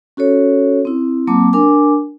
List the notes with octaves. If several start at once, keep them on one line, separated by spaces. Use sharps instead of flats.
C#4 F#4 A4 C#5
C4 E4
F#3 A#3 C4 A5 D6
D4 A#4 G#5 D6